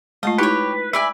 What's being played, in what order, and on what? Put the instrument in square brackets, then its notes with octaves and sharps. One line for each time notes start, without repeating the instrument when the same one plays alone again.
[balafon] G#3 A3 F4 [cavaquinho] D#5 A5
[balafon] D#4 E4 [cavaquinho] G4 C#5 [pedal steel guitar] B4
[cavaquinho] B4 D5 G#5 [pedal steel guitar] E5